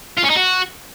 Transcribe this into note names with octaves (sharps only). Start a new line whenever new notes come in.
F4
C#4
D#4
F#4